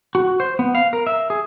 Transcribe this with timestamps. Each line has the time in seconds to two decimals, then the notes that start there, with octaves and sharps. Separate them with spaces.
0.15 F#4
0.40 C5
0.59 B3
0.75 F5
0.93 A#4
1.07 E5
1.30 G#4